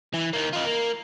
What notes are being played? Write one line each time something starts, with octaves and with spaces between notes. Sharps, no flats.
E3
D#3 A#3
F4 D#5
A#3